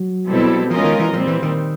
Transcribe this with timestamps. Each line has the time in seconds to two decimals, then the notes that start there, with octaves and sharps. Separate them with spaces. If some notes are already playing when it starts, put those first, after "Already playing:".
Already playing: F#3
0.27 B2 G3 C4 E4 A4
0.71 F3 G#3 C#4 F4 A#4 D#5
0.84 D#3
0.99 E3
1.13 A#2 F3 G3 C4
1.27 E3
1.42 D#3